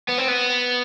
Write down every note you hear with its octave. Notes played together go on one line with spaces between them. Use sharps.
B3
C4
B3